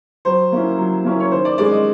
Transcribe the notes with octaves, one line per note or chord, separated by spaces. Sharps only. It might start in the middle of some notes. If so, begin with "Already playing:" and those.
F#3 C5
A#3 C#4 E4
F#3
A#3 C#4 E4
C#5
D#3 C5
D5
G#3 C#4 D5
D#5